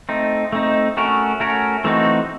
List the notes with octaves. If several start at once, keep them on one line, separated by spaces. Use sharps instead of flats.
A3 C4 D#4
A3 C4 D#4
A3 C#4 F#4 A#4
A3 C#4 F#4 A#4
E3 A3 C4 D#4 F#4